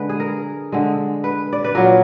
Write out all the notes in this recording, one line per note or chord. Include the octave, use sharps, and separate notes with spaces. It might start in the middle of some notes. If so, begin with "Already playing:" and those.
Already playing: D3 G#3 B4
G#4
A#4
D3 G#3
B4
D5
B4
A#2 F#3 A#4